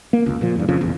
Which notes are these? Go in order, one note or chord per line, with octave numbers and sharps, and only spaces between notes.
A#3
F1 C#2
A#2 F3
E2 G2
F2 C#3 F3
F1 A#1 E2